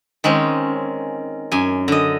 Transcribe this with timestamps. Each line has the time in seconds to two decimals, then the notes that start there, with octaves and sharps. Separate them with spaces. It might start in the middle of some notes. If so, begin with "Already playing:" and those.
0.24 D#3 G#3 C4 C#4
1.52 F#2 G#5
1.88 D3 D#5